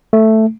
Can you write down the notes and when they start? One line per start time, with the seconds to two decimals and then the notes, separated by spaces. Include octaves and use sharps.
0.13 A3